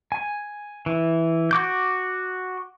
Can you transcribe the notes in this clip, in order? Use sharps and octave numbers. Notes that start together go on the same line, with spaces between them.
G#5
E3
F#4 D6 G6